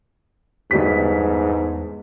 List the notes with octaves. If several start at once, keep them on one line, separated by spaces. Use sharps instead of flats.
G1 E2 G#2 G3 B6